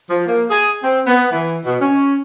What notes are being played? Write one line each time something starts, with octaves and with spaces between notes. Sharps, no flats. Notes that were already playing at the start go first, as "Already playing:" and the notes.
F3
A#3
G#4
C4
B3
E3
B2
C#4